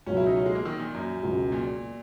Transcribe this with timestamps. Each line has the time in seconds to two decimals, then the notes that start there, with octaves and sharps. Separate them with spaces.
0.06 C#2 B2 F#3 C#4
0.17 E4
0.26 D#4
0.36 C#4
0.46 G#3
0.55 A#3
0.65 D#3
0.80 A#2
0.94 F#2
1.23 C#2 B2 F#3
1.52 A#2